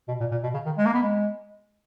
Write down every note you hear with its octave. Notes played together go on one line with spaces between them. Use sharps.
B2
A#2
A#2
B2
C#3
D#3
G#3
A#3
B3
G#3